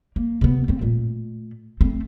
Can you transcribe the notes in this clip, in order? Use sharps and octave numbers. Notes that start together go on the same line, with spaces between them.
A#3
C3 B3
A3 C4
A#2 A3
A3 C4